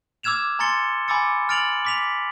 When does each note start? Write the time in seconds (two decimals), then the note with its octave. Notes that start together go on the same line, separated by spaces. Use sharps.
0.23 D6 E6 F6 G#6 E7 F7
0.59 G#5 A#5 C6 A6 C#7 G7
1.08 G#5 B5 D6 E6 A6 C#7
1.49 F6 A6 D7 F7 F#7
1.85 D6 B6 F7